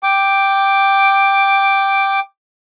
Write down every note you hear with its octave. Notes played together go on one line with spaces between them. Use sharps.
G5 D6